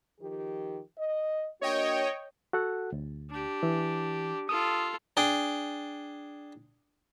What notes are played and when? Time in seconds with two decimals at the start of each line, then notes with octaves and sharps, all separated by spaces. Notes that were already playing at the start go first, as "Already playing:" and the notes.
0.20 D#3 F3 G4
0.98 D#5
1.61 A#3 D4 F#4 C#5 D#5 G5
2.53 F#4 A4 F#5
2.92 D2
3.30 D4 G4
3.63 E3
4.49 F4 A4 D#6
5.17 D4 G#4 G5